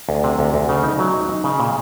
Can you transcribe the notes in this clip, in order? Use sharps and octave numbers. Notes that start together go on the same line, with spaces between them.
D2
C3
D2
D2
C#3
D#4
F#3
D#4
D#4
C#3
A#2